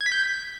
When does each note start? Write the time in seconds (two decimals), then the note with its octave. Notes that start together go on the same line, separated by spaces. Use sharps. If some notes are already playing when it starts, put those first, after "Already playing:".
0.01 G#6
0.06 B6
0.12 G6